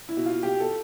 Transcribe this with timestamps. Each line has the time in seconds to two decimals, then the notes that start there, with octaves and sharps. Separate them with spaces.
0.09 E4
0.17 B2
0.26 F4
0.43 B2 G4
0.60 A4